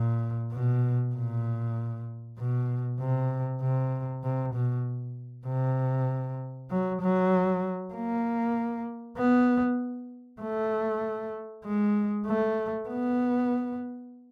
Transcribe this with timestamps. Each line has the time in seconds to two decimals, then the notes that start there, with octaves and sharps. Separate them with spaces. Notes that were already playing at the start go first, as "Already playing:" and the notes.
Already playing: A#2
0.52 B2
1.15 A#2
2.38 B2
3.00 C3
3.62 C3
4.24 C3
4.54 B2
5.47 C3
6.71 F#3
7.01 F#3
7.95 A#3
9.18 B3
10.42 A3
11.65 G#3
12.27 A3
12.89 B3